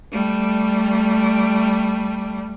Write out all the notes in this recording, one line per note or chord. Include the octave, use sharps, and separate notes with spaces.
G3 A3